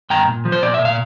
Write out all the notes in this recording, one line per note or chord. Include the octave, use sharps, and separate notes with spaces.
G2 G5 A#5
A#2
F3
C5
A#2 D5
A#2 E5
F5